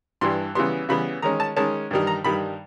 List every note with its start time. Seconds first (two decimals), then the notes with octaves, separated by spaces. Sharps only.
0.21 G2 E3 G3 C6
0.55 C#3 E3 G3 B3 C6
0.89 C#3 E3 G3 B3 B5
1.22 D#3 G#3 C#4 A#5
1.40 A5
1.56 D#3 G#3 C#4 A5
1.91 G2 D#3 G3
2.07 A#5
2.24 G2 D#3 G3 B5